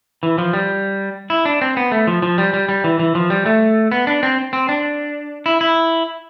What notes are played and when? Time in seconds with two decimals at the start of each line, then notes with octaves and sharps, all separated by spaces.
0.23 E3
0.38 F3
0.53 G3
1.30 E4
1.45 D4
1.61 C4
1.77 B3
1.92 A3
2.07 F3
2.22 F3
2.38 G3
2.54 G3
2.69 G3
2.84 E3
2.99 E3
3.15 F3
3.30 G3
3.46 A3
3.92 B3
4.07 D4
4.23 C4
4.53 C4
4.69 D4
5.46 E4
5.61 E4